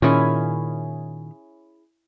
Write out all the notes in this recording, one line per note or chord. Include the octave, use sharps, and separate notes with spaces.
A#2 D#3 C#4 E4 G#4